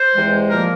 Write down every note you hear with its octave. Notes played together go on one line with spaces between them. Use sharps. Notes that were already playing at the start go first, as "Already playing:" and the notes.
Already playing: C5
E2 C3 E3 G#3
A#2 F3 A#3 A#4